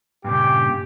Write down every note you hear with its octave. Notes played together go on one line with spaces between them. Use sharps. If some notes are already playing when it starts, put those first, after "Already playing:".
G2 A#2 C#3 G4